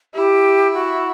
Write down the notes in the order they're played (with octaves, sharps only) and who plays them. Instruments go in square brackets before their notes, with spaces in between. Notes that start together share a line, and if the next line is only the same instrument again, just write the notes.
[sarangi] E4 [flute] G4
[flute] F#4